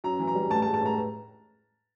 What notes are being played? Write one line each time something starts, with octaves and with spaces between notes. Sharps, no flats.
F#2 A#5
E3
A#5
G3
A2 A5
A5
G#3
A5
A2 A#5